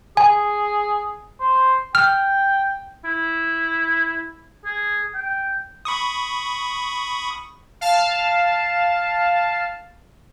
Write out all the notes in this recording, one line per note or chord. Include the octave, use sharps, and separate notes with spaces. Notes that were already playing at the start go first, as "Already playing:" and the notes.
G#4 G#5
C5
G5 F6
E4
G#4
G5
B5 C#6 D#6
F5 A5